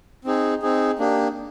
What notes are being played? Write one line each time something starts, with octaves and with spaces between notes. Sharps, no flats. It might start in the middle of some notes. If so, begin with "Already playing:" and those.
C4 D#4 G#4
C4 D#4 G#4
A#3 D4 G4